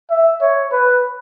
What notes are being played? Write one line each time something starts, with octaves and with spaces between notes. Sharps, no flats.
E5
C#5
B4